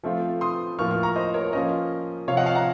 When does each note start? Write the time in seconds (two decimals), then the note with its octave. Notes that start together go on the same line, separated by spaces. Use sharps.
0.03 F3 A3 C4 F4
0.41 C6 D#6
0.79 A2 F3 A#3 F4 C#6 F6
0.91 C#6 F6
1.03 A#5 C#6
1.16 C5 D#5
1.34 A#4 C#5
1.53 F3 A#3 C#4 F4 C5 D#5
2.28 C3 F3 C4 C#5 F5
2.37 D#5 F#5
2.46 F5 A5
2.55 F#5 A#5